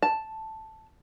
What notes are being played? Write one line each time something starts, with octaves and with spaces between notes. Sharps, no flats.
A5